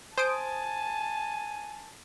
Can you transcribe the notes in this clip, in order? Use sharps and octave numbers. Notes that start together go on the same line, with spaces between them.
C5 G#5 A5 D#6 D7